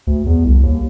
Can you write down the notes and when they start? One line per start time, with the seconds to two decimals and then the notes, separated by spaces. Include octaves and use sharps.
0.07 D2
0.26 E2
0.44 C2
0.63 D#2